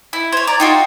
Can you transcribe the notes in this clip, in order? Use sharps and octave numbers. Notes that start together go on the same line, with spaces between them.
E4
C5 C#5 G#6
D5 A#5
D#4 F4 F#4 G5